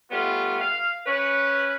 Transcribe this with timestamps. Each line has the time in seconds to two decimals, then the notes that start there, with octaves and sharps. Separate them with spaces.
0.11 G3 A3 B3 F4
0.59 F5
1.06 C#4 B4